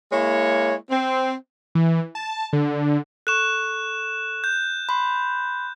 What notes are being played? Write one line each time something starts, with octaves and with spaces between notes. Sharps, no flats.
G#3 A#3 E4 C#5
C4
E3
A5
D3
A4 C#6 F#6 E7
G6
B5 C6